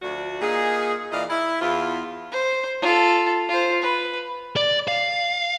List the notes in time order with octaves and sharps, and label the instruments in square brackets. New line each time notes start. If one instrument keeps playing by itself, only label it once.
[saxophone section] D2 F3 A3 D4 F#4
A#2 A#3 D#4 G#4
A#2 E3 E4 D5 D#5 F5
E4
E2 E4 F4
[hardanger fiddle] C5
F4 A4
F4 C5
B4
[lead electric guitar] D5
F5